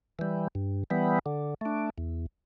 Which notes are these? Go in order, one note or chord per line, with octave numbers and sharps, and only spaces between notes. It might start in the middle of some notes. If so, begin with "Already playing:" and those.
E3 G3
G2
E3 G3 B3
D3
A3 D4
E2